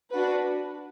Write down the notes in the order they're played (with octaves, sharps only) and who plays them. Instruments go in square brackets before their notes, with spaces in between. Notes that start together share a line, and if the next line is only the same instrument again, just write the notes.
[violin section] D4 F#4 B4